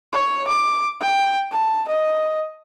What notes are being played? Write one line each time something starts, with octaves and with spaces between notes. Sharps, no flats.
C#5
D6
G5
A5
D#5